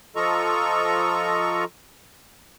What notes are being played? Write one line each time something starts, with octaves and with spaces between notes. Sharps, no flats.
F3 F4 A4 D#5 A#5 C#6